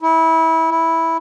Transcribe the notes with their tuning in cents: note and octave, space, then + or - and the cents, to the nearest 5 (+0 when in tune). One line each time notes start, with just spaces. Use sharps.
E4 -25
E4 -10